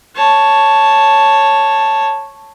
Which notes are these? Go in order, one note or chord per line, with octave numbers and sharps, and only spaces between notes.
C#5 A5